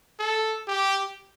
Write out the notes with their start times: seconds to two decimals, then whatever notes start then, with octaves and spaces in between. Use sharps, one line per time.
0.19 A4
0.67 G4